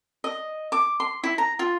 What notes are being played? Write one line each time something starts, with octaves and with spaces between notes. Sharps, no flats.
D#5
D6
C6
E4
A#5
F4